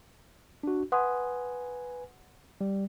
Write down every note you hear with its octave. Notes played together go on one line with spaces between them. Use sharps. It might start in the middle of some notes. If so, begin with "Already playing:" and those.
D4 F#4
B4 F#5 G#5 C6 D#6
G3